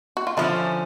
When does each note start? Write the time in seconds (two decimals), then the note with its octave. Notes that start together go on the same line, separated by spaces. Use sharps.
0.17 F#4
0.27 F4
0.37 D3 F3 A3 C#4 E4